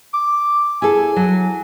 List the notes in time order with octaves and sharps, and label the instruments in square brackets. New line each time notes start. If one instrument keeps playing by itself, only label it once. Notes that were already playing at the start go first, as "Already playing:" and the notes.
[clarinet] D6
[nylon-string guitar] E4 G#4 A4 [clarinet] G#5
[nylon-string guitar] F#3